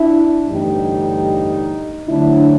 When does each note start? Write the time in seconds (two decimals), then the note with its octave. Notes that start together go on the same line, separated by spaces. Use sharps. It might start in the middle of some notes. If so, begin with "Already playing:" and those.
Already playing: D4 E4
0.48 A1 G2 D3 G3 D#4
2.08 D2 D3 F#3 D4 E4